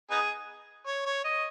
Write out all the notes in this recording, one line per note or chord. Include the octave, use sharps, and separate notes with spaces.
B3 D#4 G#4
C#5
C#5
D#5